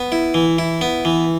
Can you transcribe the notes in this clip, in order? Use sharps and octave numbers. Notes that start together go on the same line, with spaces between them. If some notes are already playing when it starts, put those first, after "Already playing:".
Already playing: B3
E4
E3
E4
B3
E3